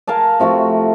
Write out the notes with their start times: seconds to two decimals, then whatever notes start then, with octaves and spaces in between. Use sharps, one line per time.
0.07 A#4 F5 G#5 A5
0.40 C3 F3 A3 F#4